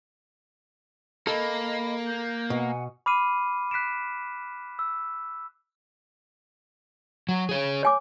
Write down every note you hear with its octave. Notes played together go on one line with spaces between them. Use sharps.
A#3 A4 D#5 B5
G6
B2 F#5 G#5
B5 D6 F6 C7 D#7
F#6 B6 C7 D7 E7
E6
F#3
G#4 C#5
C#5 G#5 D6